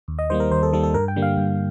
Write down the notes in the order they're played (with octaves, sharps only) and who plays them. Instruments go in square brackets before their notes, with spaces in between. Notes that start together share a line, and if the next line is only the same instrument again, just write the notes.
[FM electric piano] D#2
D#5
D#3 G3 A#3 C5
A#4
D#2 C5
A4
D#3 G3 A#3 A4
A4
G2 A#4
G5
D3 G3 A#3
F5
G2